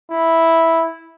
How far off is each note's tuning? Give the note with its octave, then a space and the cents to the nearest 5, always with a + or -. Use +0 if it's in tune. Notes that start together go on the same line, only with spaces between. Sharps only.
E4 -5